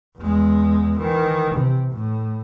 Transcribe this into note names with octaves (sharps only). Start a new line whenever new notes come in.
E2 G#3
D#3 E3
C3
A2